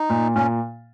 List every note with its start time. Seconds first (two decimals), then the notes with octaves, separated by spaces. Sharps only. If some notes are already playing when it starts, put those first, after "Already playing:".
Already playing: D#4
0.10 A#2
0.35 A#2 C#4